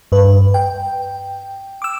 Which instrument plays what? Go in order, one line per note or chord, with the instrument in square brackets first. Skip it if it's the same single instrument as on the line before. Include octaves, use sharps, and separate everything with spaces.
[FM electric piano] G2 B4
G5
D6 E6